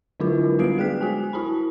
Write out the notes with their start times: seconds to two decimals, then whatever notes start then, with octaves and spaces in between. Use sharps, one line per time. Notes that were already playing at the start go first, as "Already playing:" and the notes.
0.20 D3 F#3 D4 E4 F4 A#4
0.59 G3 B3 F#4 B4 C7 D7
0.78 G#3 G#4 G5 F#6 B6
1.01 F#4 G#5
1.33 E4 F#4 A5 B5